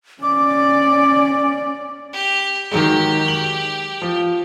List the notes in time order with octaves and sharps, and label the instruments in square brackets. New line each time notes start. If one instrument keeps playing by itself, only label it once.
[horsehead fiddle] C#4 D5 [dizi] D6
[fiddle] G4
[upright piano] D#3 F#3 G#3 [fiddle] G4
[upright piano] F#7
F3